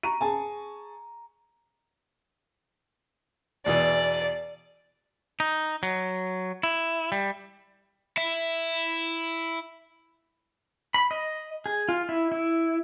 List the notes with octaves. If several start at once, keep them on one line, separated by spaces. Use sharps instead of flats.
A#5 C#6 D#7
G#4 G#5 A5
E2 B2 E3 D5
D#4
F#3
E4
G3
E4 E5
B5
D#5
G#4
F4
E4
E4